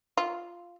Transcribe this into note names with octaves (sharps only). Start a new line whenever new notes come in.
F4